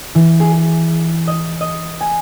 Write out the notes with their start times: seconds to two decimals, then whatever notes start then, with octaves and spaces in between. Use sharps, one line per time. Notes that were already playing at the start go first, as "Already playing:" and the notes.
0.15 E3
0.40 G#4
0.56 G#4
1.27 D#5
1.61 D#5
2.01 G#5